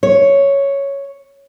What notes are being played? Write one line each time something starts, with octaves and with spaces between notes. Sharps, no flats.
C#5